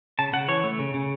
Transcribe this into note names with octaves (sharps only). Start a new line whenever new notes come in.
C#3 A5
C#3 F#5
E3 C#5
A3
C#3
C#3